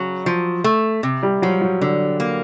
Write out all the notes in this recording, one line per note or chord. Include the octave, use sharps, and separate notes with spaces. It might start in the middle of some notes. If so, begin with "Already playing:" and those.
Already playing: C#3 F#3
F3
A3
C3
G3
F3 F#3
F#3
D3
A#3